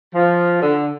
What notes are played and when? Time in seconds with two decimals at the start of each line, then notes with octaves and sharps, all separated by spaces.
0.14 F3
0.61 D3